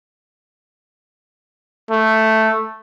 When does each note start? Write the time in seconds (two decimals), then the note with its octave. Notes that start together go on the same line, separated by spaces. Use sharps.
1.91 A3